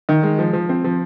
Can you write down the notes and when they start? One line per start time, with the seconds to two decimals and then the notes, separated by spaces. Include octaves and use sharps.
0.09 D#3
0.23 G#3
0.39 F3
0.53 F3
0.69 C4
0.84 F3